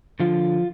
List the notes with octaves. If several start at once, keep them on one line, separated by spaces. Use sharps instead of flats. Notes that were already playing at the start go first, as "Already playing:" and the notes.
D3 F3 F4